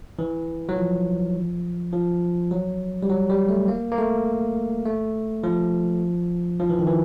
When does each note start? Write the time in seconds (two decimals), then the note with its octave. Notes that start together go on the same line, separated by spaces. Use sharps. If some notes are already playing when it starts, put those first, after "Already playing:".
0.19 E3
0.69 F#3
0.76 F3
1.93 F3
2.51 F#3
3.03 G3
3.10 F#3
3.30 G3
3.49 A3
3.68 A#3
3.92 A#3
3.98 A3
4.85 A3
5.44 F3
6.60 F3
6.70 E3
6.79 D#3
6.87 E3